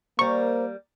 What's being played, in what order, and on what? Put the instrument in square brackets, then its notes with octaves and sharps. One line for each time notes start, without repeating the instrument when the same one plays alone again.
[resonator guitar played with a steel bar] G3 A#4 [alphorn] A#3 [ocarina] C5 [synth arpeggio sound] C#6